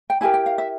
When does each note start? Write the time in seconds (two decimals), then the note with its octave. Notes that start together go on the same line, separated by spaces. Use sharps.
0.10 G5
0.21 E4 G4 A#4 G#5
0.34 G5
0.46 F5
0.58 E5